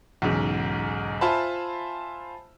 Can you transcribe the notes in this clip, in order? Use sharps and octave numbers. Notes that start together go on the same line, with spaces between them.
B1 E2 G#2 C#3
F4 C5 E5 G#5 A5 B5